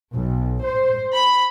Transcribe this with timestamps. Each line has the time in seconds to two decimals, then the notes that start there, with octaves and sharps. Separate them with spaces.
0.14 B1
0.64 C5
1.13 B5